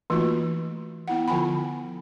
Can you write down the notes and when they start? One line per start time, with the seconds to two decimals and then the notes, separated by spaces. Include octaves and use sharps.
0.10 E3 A3 A#3 D#4 F4 F#4
1.08 B3 E4 F#5
1.28 D3 F3 F4 G5 G#5 B5